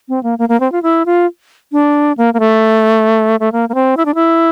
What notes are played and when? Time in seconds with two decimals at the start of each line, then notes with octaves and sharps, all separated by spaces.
0.09 C4
0.23 A#3
0.39 A#3
0.49 A#3
0.60 C4
0.72 F4
0.83 E4
1.06 F4
1.72 D4
2.18 A#3
2.34 A#3
2.40 A3
3.40 A3
3.52 A#3
3.69 A#3
3.75 C4
3.97 E4
4.05 D4
4.15 E4